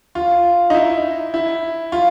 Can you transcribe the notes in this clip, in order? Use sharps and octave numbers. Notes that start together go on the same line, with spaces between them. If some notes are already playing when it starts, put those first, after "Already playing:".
F4
D#4
E4
E4
F4